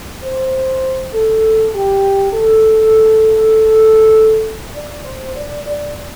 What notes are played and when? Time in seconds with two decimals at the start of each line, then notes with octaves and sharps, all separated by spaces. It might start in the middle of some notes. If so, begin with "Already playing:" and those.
0.23 C5
1.14 A4
1.74 G4
2.33 A4
4.75 D5
5.06 C5
5.36 D5
5.65 D5